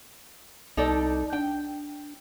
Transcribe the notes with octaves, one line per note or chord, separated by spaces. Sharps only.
C2 D#4 A4 D5
D4 G5